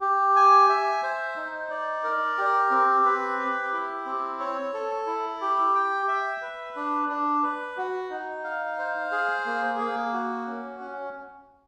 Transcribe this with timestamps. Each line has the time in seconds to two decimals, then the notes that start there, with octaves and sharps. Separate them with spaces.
0.01 G4
0.36 G#5
0.69 E5
1.03 C5
1.37 D#4
1.70 D5
2.04 A#4
2.38 G4
2.71 C4
3.05 B4
3.39 G4
3.73 E4
4.06 C4
4.40 C#5
4.74 A4
5.07 E4
5.41 G4
5.75 G5
6.08 E5
6.42 B4
6.76 D4
7.09 D4
7.43 B4
7.77 F#4
8.10 D#4
8.44 F5
8.78 C5
9.12 G#4
9.46 A#3
9.79 A#3
10.13 F#4
10.47 C#4
10.80 C#4